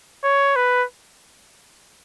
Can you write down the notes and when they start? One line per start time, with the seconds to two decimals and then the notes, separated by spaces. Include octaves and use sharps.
0.24 C#5
0.56 B4